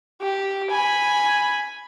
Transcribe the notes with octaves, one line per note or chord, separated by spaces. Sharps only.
G4
G#5 B5